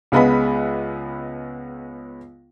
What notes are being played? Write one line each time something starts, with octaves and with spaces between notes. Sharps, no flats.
C#2 G#3 B3 B4 B5